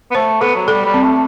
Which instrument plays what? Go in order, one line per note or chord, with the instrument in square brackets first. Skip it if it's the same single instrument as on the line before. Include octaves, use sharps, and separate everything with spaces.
[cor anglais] B3
[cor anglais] A3 [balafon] C5
[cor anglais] B3 [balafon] A4
[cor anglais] F#3
[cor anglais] G3 [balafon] A4
[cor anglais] G3
[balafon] C4
[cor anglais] A3